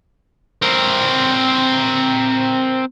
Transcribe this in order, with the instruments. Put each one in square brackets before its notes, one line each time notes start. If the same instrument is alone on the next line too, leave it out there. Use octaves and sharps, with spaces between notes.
[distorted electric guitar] C4 A#4